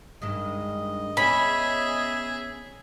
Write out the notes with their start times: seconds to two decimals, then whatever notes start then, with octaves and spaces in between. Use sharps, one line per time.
0.22 G2 D#3 G#3 D#5
1.17 B3 C#4 G#4 C#5 E5 B5